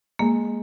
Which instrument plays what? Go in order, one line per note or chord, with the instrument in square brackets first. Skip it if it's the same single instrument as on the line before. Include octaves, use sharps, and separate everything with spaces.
[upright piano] G#3 [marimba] A#3